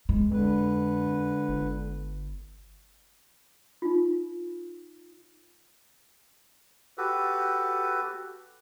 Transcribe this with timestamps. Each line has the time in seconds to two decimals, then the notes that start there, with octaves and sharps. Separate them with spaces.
0.09 G#3
0.31 F2 D3 B4
1.49 G1
3.82 D#4 F4
6.98 F#4 G4 A4 B4